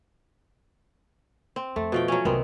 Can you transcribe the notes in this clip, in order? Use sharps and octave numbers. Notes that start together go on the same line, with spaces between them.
C4
F2 A3
B2 F3 G5
F#3 C#4
C2 F#2 D#3 B3 C4